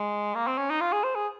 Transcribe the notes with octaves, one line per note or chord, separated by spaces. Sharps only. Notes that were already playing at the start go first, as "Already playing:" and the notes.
Already playing: G#3
A#3
C4
C#4
D#4
F4
G#4
C5
G#4